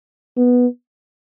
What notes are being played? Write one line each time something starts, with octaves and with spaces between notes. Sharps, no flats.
B3